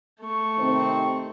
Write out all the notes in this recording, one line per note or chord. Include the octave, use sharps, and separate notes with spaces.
A3 C#6
C3 D#3 C4